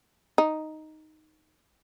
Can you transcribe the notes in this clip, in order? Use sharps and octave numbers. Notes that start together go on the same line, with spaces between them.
D#4